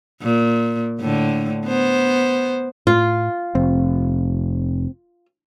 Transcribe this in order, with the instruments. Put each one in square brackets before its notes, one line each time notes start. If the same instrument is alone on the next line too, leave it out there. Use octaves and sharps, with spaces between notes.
[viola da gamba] A#2
A2 D3
B3 C5
[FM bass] A2 [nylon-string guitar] F4
[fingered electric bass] F1 [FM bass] C4